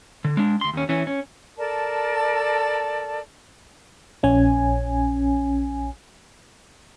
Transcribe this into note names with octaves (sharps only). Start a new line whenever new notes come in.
D3
G#3 D4
D2 C6
D#2 C#4
E3 C#4
C#4
A4 A#4 D5 A5
A#1 C#4 G#5